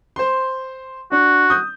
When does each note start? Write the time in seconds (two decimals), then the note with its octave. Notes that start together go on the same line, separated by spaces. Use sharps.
0.16 C5 C6
1.12 D4 F#4
1.50 D#6 G6